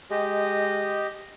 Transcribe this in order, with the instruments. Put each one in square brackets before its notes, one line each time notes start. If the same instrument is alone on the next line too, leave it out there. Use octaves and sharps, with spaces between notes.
[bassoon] G#3 [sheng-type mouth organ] G4 D#5